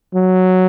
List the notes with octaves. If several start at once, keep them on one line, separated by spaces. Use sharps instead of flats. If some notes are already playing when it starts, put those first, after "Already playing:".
F#3